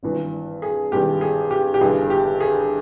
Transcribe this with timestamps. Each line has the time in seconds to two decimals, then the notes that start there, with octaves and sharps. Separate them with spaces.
0.03 G#1 G2 E3
0.62 G#4
0.92 G#1 G2 E3 G4
1.21 G#4
1.51 G4
1.74 G4
1.81 G1 G2 E3 G#4
2.10 G4
2.41 G#4